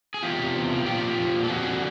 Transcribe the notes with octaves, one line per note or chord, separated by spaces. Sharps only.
G#4
E2 F4 G4
C3
E2
F3
A#2 F4 G4
F3
F3
A#2
A4
F2 F#4 G#4
D3